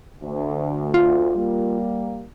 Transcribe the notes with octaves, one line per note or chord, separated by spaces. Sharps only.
D2
F4
G3 A#3